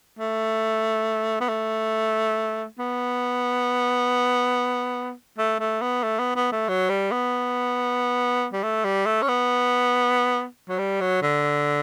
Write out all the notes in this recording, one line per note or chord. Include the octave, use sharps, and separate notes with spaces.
A3
B3
A3
B3
A3
A3
B3
A3
B3
B3
A3
F#3
G3
B3
G3
A3
G3
A3
C#4
B3
F#3
G3
F#3
D3